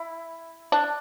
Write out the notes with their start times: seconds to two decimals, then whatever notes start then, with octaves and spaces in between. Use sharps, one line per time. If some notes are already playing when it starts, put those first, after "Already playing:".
Already playing: E4
0.72 D4